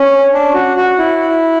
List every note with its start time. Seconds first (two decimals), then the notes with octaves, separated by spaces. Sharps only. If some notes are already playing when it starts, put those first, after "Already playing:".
Already playing: C#4
0.33 D4
0.54 F#4
0.77 F#4
0.98 E4